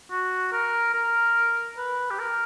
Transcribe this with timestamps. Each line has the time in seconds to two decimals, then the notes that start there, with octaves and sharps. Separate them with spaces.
0.11 F#4
0.52 A#4
0.94 A#4
1.78 B4
2.10 G4
2.19 A#4